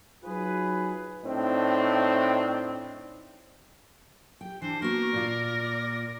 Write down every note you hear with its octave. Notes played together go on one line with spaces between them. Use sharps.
F#3 D#4 F4 G#4 B4
A2 C4 D4 D#4
G4 G5
E3 D4 C5
A#3 B3 F#4 A#4
A#2 F4 D5